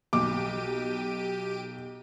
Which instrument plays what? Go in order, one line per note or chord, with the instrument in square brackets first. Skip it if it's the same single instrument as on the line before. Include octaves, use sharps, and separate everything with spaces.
[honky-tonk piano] B1 [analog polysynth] G4 D7 D#7 [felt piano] D6